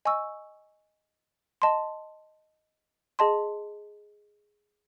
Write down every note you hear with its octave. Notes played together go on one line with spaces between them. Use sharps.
D#5 G#5 C#6 E6
D#5 A5 C6
G#4 D#5 A5 C6